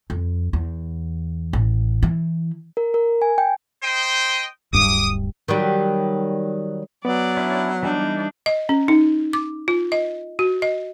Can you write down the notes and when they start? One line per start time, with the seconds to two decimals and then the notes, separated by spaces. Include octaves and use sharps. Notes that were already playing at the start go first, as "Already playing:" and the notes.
0.10 F2
0.53 E2
1.53 A1
2.03 E3
2.77 A#4
2.94 A#4
3.22 G#5
3.38 G5
3.83 C5 D#5 G5
4.73 D1 G2 D6 D#6
5.48 D#3 F#3 G3
7.05 F#3 B3 D5
7.37 C#4 D4 E4
7.83 E3 G3 D4 D#4
8.46 D#5
8.69 C#4
8.88 D#4
9.33 D6
9.68 F4
9.92 D#5
10.39 F#4
10.62 D#5